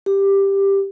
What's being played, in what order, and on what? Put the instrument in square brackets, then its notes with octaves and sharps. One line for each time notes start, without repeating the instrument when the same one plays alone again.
[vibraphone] G4